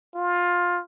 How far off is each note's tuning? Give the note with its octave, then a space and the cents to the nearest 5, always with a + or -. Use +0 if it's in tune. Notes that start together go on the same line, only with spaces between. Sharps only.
F4 +15